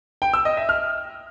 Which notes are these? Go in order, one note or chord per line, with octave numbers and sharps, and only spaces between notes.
G5
E6
D#5
E5
F6